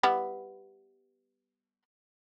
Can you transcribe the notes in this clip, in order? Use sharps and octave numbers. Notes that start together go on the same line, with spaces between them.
G3 B3 E4